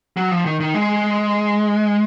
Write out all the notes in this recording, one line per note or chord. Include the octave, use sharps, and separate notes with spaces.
F#3
F3
D#3
D#3
G#3